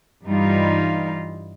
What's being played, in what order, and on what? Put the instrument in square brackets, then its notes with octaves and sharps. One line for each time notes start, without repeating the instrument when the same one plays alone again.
[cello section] G2 E3 G3 D#4 F4